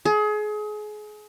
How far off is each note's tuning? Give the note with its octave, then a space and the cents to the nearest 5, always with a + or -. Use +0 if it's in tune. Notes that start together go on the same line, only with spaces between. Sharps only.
G#4 +30